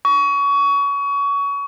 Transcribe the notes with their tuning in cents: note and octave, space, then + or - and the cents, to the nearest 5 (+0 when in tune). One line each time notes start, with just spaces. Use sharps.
C#6 +25